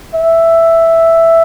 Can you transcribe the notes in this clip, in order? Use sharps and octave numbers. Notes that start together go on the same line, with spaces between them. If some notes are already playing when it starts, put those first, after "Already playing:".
E5